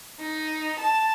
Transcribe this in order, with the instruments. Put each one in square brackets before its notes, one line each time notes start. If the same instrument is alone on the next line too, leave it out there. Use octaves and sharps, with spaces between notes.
[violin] D#4
A5